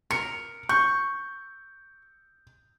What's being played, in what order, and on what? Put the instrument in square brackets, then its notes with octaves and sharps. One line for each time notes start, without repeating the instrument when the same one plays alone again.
[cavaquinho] A#4 [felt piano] C#7
[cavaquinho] C#6 [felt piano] G6